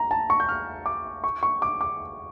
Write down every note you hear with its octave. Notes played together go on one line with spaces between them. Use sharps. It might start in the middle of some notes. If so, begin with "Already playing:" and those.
Already playing: A#5
A5
C#6
G6
F6
D6
C#6
C#6
D6
D6